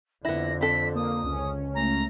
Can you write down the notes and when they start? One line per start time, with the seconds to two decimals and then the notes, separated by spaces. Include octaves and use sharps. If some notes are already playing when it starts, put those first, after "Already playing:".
0.25 F2 D3 B3 E4 A#6
0.61 C4 A4 B6
0.95 A#3 D#6
1.24 C#2 C#4
1.74 A3 A#5